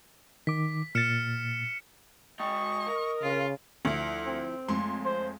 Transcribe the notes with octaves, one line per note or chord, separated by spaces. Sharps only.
D#3 D6 B6
A#2 F6 A6 C#7 E7
G#3 D#5 G5 C#6
A#4
C#3 F4
D2 F3 E4
C4
F2 G#3 A3 C#5 C6
C5